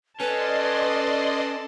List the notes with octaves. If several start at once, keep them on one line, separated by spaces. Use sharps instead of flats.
C#4 A4 B4 D5 D#5 A5 C6